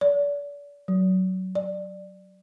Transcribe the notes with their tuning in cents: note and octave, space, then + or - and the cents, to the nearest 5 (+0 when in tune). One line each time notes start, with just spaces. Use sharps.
D5 -35
F#3 +10
D5 +15